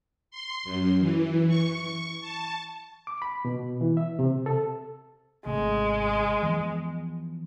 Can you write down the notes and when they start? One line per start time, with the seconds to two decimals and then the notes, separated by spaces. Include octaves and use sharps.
0.31 C6
0.64 F#2
0.99 E3
1.48 C#6
2.21 A5
3.07 D6
3.22 B5
3.45 B2
3.81 E3
3.97 E5
4.19 C3
4.46 A4
5.46 G#1 C3 G#3 A3
6.43 E3 F3 B3